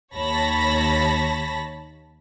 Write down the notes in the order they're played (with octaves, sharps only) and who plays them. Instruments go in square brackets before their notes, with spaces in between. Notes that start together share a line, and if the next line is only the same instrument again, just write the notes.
[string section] D#2 C#5 A5 B5 A#6